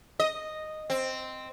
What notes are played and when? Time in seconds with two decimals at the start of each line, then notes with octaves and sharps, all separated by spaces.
0.20 D#5
0.90 C4